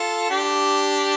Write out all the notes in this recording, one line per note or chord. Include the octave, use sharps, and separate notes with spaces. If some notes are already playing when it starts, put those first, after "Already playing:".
Already playing: F4 A4
D4 G4